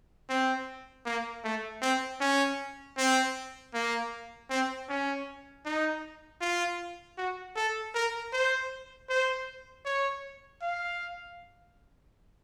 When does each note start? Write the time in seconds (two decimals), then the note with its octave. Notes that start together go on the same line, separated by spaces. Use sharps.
0.29 C4
1.06 A#3
1.44 A3
1.82 C4
2.20 C#4
2.98 C4
3.74 A#3
4.50 C4
4.89 C#4
5.65 D#4
6.41 F4
7.18 F#4
7.56 A4
7.95 A#4
8.33 C5
9.09 C5
9.85 C#5
10.62 F5